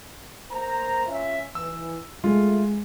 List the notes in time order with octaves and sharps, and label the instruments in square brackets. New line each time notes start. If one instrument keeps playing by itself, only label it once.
[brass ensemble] A#3 C5 A#5
C#4 F4 E5
[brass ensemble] E3 [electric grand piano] E6
[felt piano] G#3 [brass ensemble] A3 E5 [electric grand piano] F4